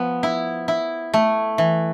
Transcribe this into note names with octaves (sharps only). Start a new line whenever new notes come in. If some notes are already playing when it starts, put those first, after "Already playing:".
Already playing: F3 B3
E4
E4
A3
E3